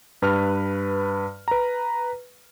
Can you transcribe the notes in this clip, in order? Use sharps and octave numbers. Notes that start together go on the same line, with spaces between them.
G2 B4 F6
B4 A#5